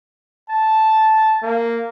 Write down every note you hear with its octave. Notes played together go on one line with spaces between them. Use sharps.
A5
A#3